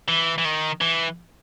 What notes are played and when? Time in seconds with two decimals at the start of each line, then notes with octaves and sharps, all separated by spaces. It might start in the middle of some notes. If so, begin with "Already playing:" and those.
0.08 E3
0.38 E3
0.45 D#3
0.81 E3